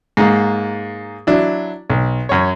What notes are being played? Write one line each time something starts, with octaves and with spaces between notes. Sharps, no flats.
G#2 A#3
F#3 D4 E4
B1
F#2 C#5